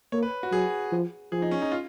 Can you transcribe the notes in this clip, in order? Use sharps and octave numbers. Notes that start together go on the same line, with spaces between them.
A#3 C#5
B4
F#4
F#3 G#4
F3
F3 G#4
D#4
C#4
D#4
F4